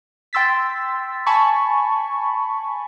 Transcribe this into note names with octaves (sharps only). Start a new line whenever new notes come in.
G5 C6 E6 A6 B6
G#5 A5 B5 C#6